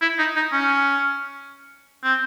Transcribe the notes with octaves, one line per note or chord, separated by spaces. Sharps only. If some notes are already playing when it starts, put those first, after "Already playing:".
E4
D#4
D#4
C#4
C4